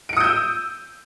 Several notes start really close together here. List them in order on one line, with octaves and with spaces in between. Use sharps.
D7 C#7 D#6 G6 E6